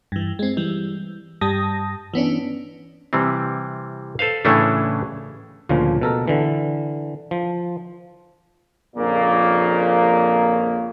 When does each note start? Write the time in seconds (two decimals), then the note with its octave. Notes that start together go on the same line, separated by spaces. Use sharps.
0.12 G2 E3
0.39 G#3 C4
0.57 E3 G3
1.41 G2 G3 A5 D#6 A#6
2.14 E3 B3 C#4 D4
3.13 C3 E3 G3 C4
4.19 A4 B4 C5 F5
4.45 A2 C#3 E3 A3 C#4 D4
5.69 D2 A#2 C#3 F3
6.01 B2 A4 A#4
6.28 D3 E3
7.31 F3
8.96 A#1 F2 A#2 C#3 A#3